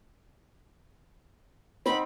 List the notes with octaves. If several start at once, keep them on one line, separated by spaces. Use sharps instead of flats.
C4 D#4 F#5 B5